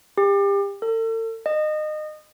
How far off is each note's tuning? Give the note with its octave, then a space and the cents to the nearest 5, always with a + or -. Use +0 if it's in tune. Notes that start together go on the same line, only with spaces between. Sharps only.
G4 +30
A4 +40
D#5 -25